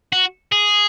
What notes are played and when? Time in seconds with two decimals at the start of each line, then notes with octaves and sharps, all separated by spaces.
0.13 F#4
0.52 G#4